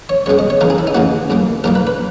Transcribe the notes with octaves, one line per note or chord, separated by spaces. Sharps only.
C#5
C#2 B2 G#3 C#5
D#5
C#5
D#2 C#3 E3 A#3 A#4
G#4
E4
D#4
D#2 C#3 E3 A#3 F#4
B1 A#2 A#3
B1 A#2 A#3 A#4
B4
B4